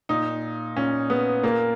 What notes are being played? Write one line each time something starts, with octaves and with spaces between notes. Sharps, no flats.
A#2 D#4
A#2 C#4
B3
A#2 A#3